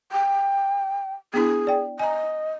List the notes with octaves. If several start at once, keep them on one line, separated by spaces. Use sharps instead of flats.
G5
B3 D4 E4 G#4
D5 G5
D#5 G#5 A#5